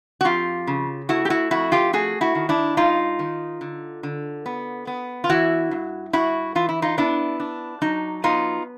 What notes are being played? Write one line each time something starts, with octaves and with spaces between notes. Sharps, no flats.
F#4
F2 F4 G4
C#3
A3 E4 F#4
G4
E4 F#4
F2 E4 F#4
F4 G4
A3 F#4 G#4
E4 F#4
D#3
D4 E4
G2 D#4 F4
D#3
D3
D3
B3
B3
F4
E3 E4 F#4
G2
G2 E4 F#4
E3 F4
E4
D#4 F4
B3 D4 E4
D4
F#3 D#4
B3 D#4 F4